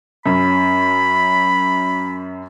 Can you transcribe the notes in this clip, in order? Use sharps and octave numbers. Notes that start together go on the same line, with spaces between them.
F#2 C#4 B5